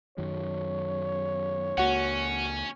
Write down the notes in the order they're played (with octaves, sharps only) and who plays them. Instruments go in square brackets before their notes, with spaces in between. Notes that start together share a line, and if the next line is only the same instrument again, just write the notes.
[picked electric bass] F#2 D#3 F#3 [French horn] C#5
[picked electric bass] C#2 A#3 [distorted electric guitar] C#4 [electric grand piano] F#4 F#5